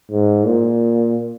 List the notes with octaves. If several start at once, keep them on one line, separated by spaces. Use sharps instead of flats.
G#2
A#2